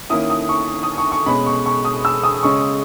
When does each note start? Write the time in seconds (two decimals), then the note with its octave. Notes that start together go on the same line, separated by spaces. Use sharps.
0.10 D#3 A#3 C#4 E4 D#6
0.30 D#6
0.49 C#6
0.83 D#6
0.98 C#6
1.12 C#6
1.26 B2 G#3 C#4 B5
1.46 C#6
1.66 C#6
1.85 D#6
2.05 E6
2.24 D#6
2.43 C#3 G#3 C#4 C#6